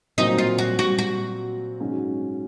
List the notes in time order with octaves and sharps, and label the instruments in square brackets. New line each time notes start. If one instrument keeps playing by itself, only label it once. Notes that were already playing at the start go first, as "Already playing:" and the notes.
[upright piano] A#2 F#3 C4 [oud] D#4
[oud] F4
F#4
F#4
F#4
[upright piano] G#2 F#3 C#4